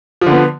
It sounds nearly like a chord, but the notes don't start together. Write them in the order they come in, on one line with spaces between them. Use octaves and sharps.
F3 D3 B3